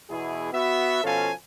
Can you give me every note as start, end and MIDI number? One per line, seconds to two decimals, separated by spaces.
0.10 0.49 40
0.10 0.49 47
0.10 0.49 64
0.10 0.49 68
0.52 1.04 59
0.52 1.04 66
0.52 1.04 76
1.04 1.31 47
1.04 1.31 53
1.04 1.31 61
1.04 1.31 69
1.04 1.31 77
1.04 1.31 80